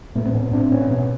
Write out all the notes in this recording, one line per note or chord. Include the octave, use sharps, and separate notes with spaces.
A2 A3 B3
C4
A2 B3 C#4
A2 C4 D4
A2 B3 C#4
B2 B3 C#4